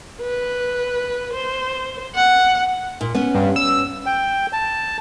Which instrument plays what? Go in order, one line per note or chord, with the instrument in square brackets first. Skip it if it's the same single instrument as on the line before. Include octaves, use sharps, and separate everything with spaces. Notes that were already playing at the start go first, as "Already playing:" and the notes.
[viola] B4
C5
F#5
[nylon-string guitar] A#2
B3 C#4
[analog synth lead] G2
E6
[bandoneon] G5
A5